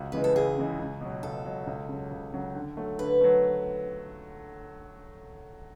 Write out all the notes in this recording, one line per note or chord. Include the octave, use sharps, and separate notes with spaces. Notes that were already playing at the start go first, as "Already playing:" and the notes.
Already playing: C#2 F#4
C#3 E3 G#3 B4
A4
C#2 G#4
C#3 E3 G#3
C#2
B2 F#3
C#2 A4
B2 F#3
C#2
C#3 F#3
C#2
C#3 F#3
D3
F#3 A3
D3 B4
F#3 A3